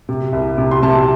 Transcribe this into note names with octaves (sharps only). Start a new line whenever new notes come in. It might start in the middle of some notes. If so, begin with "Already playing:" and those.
C3
C2
C3
C6
C3 A5